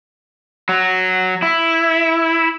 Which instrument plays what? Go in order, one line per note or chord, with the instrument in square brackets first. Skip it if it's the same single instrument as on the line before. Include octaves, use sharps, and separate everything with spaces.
[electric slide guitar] F#3
E4